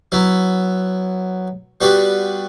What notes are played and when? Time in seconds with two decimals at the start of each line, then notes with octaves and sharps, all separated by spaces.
0.12 F#3 B3 E4
1.81 G3 B3 D4 F#4 B4